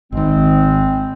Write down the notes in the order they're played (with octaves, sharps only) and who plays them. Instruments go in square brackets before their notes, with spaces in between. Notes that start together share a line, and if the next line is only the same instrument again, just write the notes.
[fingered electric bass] G#1 D#3 [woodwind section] G#3 C4